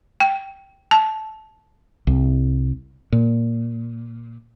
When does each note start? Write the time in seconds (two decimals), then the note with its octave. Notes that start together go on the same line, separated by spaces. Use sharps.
0.20 G5
0.91 A5
2.07 C2
3.12 A#2